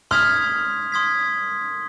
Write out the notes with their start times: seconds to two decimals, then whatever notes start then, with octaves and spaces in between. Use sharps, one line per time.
0.11 C6 D#6 F6 G#6 B6
0.92 C6 D#6 G#6 B6